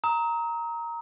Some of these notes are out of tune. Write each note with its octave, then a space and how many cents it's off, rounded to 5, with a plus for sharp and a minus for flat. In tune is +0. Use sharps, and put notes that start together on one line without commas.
A#5 +0 D#6 +40